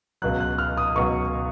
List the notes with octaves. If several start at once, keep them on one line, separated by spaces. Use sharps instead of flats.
C#2 B2 F#3 F#6
F#6
F6
D#6
C#2 B2 F#3 C#6